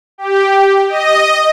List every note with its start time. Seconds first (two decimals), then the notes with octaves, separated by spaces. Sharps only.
0.18 G4
0.89 D#5